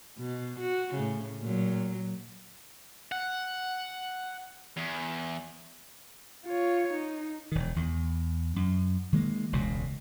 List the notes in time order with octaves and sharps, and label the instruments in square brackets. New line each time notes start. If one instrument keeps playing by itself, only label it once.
[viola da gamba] B2
F#4
A2 C#3
A#2 F#3
[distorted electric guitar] F#5
E2
[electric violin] F4 C#5
D#4
[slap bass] E1 D#3
E2
F#2
D#3 G#3 A#3
E1 C#2 B2